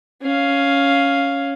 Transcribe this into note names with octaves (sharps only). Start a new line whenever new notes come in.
C#4 F5